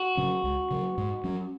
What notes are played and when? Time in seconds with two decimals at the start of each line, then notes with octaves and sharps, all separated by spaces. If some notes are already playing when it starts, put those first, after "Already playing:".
Already playing: F#4
0.17 C#3 F#3 C#4
0.44 C#2
0.71 C#3 F#3
0.98 G#2
1.24 F#3 C#4